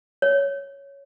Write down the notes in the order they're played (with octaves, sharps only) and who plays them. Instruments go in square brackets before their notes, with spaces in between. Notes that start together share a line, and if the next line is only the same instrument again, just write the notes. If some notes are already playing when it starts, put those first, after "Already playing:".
[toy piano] C#5